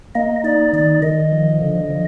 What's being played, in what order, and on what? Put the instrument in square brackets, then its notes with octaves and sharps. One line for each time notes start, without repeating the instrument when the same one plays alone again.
[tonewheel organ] A#3 [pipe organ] D#5
[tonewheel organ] D#4 [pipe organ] D5
[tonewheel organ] D#3 [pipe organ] D5
[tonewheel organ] D#3 [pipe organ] D#5
[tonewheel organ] F3
D3
F3